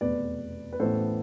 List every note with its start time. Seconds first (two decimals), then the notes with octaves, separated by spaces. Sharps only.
0.01 F1 E2 B2 B4 D5
0.73 B4
0.79 A1 A2 E3 B3 A4 C5